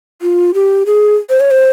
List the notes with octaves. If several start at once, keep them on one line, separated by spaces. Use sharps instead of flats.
F4
G4
G#4
C5
C#5
C5